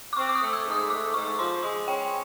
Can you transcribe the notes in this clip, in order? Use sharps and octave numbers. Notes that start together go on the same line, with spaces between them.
D6
C4 C#6
D6
D#6
A3
E6
G#2
D#6
A3 D6
G#2 C#6
F3 C6
G#3 C6
C#4 G5